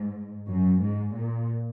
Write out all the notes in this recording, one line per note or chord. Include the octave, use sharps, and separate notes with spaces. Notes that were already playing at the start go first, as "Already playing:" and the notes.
Already playing: G#2
F#2
G#2
A#2